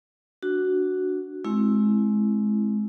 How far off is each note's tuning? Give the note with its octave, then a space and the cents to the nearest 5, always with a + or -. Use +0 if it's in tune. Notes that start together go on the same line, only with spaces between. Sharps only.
D4 +0 F#4 +0
G#3 +25 C4 +15 E4 +0